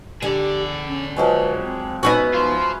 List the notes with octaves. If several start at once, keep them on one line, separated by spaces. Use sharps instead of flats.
D3 G4 G#4 D5
C#4
F3 F#3 G#3 B4
C4
B3 C#4 D#4 F#4 B4 E5
F4 C5 C6